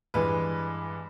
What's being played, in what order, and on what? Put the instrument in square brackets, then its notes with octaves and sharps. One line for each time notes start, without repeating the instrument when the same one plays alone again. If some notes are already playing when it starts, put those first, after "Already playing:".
[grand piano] G2 E3 G#3 B4